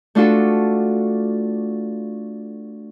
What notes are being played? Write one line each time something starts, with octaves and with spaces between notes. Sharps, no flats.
A3 D4 F4 F#4 A4